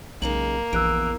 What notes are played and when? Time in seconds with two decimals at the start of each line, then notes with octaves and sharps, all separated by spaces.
0.22 B1 C#3 G#3 A#3 D#4 F#7
0.73 A#1 E2 E6 F#6 D7